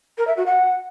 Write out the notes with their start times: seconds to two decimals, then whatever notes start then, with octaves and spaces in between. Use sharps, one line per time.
0.18 A#4
0.27 E5
0.37 F#4
0.46 F#5